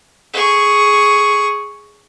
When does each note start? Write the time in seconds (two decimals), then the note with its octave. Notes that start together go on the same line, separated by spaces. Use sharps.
0.34 G#4 C#6